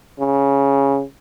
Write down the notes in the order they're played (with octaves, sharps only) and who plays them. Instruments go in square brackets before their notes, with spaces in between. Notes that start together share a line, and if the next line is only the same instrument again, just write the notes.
[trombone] C#3